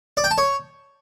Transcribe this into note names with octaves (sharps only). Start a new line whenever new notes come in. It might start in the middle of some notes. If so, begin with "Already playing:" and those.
D5
G5
A5
C#5